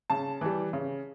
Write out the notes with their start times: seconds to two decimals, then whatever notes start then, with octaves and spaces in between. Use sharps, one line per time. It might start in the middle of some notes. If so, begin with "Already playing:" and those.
0.10 C#3 A5
0.41 E3 G3
0.73 C#3